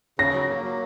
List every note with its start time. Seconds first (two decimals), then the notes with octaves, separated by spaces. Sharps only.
0.19 C#3 A#6
0.34 F#3
0.49 A#3
0.64 F#3